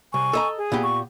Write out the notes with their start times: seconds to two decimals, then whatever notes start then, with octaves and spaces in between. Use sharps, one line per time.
0.14 C2 G#5 C#6
0.33 A4 D#5 A#5
0.57 G#4
0.72 A#2 B3 G4
0.83 C#6